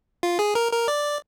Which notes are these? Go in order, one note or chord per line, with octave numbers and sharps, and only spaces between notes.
F4
G#4
A#4
A#4
D5